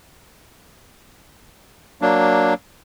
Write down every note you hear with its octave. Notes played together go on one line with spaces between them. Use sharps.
F#3 A#3 D4